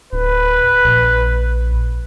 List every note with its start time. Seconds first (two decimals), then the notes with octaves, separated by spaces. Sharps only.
0.13 D1 B4
0.85 A#1